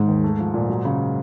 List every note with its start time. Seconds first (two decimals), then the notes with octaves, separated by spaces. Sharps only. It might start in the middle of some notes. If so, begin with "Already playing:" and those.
Already playing: G#2 D#3 G#3
0.08 D#2
0.24 A3
0.39 F3
0.54 A#2
0.69 F#3
0.85 C#3